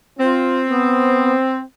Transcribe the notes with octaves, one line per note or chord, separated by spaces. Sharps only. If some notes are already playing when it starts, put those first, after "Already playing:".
C4 F4
B3